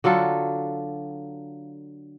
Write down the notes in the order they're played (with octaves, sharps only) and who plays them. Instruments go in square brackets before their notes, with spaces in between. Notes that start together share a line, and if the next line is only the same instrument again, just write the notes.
[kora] D3 F#3 F4 A4